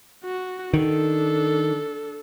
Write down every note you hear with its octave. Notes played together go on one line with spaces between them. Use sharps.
F#4
D#3 D4 A4